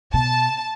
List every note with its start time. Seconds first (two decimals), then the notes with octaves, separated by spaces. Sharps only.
0.14 B2 A5